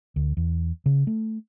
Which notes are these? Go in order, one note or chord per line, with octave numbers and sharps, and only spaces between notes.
D2
E2
C#3
A3